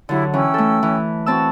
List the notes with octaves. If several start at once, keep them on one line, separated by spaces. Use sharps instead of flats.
D3 F#3 E4 G4
E3 C#4 G5 E6
A3 A4
E3
C4 F#4 A5 B5 E6